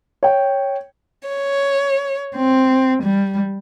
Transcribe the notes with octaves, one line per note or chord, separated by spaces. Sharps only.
C#5 G5
C#5
C4
G3